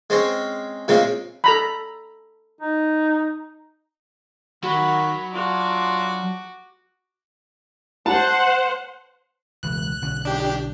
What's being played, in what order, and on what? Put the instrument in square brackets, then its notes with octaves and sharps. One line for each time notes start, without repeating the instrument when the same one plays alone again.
[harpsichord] G#3 C4 C#4
A#2 C#3 G#3 C4
[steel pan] A4 A#5 B5
[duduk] D#4
[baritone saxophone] D#3 [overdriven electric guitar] F#3 [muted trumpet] F#4 [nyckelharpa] B5
[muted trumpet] D4 [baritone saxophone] F4 [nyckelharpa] F#4 D6
[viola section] C5 F#5 [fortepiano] A5
[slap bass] E1 C#2 [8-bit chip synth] F#6
[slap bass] B1 D3 C#4
[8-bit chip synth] D4 G4